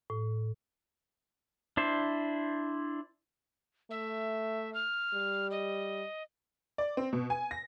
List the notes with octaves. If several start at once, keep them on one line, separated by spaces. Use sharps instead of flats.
A2
D4 E4 C5
A3 E5
F6
G3
D#5
D5
C4
B2
G#5
A#6